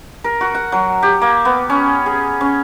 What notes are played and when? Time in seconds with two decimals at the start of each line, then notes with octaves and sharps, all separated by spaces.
0.24 A#4
0.41 F#4
0.55 F#5
0.72 F#3
1.03 G4
1.21 A#3
1.45 B3
1.70 C#4
2.06 G#4
2.41 C#4